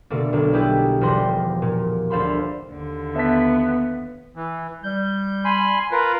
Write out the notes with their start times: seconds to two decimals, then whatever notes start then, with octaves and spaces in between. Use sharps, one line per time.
0.10 B2 D3 A3 A#3
0.33 B1 D3
0.53 G3 D#4 E4 G4 G#4 B4
1.01 E1 F3 G3 B4 C6 A#6
1.62 A#2
2.10 D2 A4 C5 F5 B5 C6
2.70 D#2 D3
3.16 B3 E5 A5 B6
4.36 E3
4.84 G3 G6
5.45 G#5 B5 C6
5.92 F4 A#4 B4